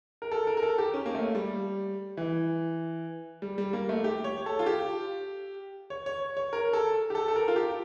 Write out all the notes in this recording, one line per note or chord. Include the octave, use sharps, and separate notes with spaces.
A#4
A4
A#4
A#4
A4
G4
C#4
A#3
A3
G3
E3
G3
G3
A#3
A3
G4
C#5
A4
F4
G4
C#5
C#5
C#5
A#4
A4
G4
A4
A4
A#4
F4
G4